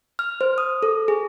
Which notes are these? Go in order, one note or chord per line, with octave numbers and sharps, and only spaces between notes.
F6
C5
D#6
A4
G#4